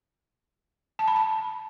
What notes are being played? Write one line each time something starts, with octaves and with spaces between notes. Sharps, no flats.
A5
B5
A5